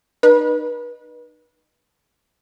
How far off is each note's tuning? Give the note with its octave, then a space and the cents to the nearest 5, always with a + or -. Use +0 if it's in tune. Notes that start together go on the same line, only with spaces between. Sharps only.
D#4 -35 B4 -30